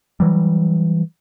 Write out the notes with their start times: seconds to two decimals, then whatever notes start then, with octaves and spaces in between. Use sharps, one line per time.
0.20 E3 F#3 G3